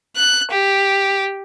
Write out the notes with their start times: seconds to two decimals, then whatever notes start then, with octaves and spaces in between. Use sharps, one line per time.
0.16 F#6
0.51 G4